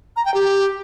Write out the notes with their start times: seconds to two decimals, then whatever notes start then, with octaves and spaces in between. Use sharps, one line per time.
0.16 A#5
0.25 G5
0.34 G4